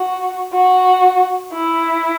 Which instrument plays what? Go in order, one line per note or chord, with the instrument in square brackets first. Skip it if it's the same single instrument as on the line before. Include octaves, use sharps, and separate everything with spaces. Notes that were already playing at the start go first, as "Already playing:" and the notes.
Already playing: [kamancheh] F#4
F#4
E4